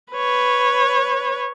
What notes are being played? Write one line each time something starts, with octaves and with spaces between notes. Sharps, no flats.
B4 C#5